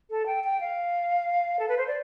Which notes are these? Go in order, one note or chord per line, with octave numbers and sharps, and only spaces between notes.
A4
G5
G5
F5
A4
B4
C5
D5